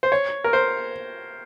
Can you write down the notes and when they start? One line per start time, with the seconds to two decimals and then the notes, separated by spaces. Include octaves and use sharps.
0.03 C5
0.12 C#5
0.44 A#4
0.53 C5